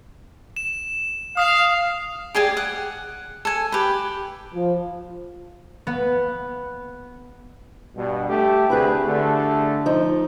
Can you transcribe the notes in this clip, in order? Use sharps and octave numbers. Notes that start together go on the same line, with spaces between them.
E7
F5 D#6 C7 F7
G4 G#4 D5 G#5
F#5
A4 G#5
G4 B4
F3
B3
G2 B2
A3 G4
D2 C4 E4 G4 G#4 B4
D3 A3
F3 D#4